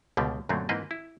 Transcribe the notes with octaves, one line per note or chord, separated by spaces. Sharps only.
C#2 B2 D3 G3
F#2 A#2 D3 F#3 A3 C4
G#2 E3 A#3 C4 B4 D#5
E4